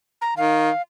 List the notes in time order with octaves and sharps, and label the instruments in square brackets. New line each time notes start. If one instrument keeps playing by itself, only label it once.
[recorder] A#5
[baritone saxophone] D#3 [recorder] F5